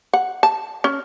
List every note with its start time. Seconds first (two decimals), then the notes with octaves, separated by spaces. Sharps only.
0.13 F#5
0.43 A5
0.84 C#4